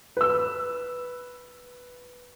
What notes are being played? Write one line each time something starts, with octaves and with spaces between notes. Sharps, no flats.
B4 E6